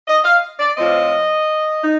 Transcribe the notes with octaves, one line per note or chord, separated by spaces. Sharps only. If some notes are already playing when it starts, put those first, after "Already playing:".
D#5
F5
D5
A2 F3 C4 F4 D#5
D#4